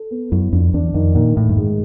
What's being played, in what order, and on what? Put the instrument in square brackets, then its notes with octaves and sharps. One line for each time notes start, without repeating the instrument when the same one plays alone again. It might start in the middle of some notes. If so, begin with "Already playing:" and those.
Already playing: [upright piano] A4
B3
[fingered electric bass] F#2 [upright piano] E4
[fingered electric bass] F2 [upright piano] D4
[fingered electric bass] E2 [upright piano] D4
[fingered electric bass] F2 [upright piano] D#3
[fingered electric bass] A#2 [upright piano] D#3
[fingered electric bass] A2 [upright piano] D#3
[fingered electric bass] G2
[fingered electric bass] G#2 [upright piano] G#3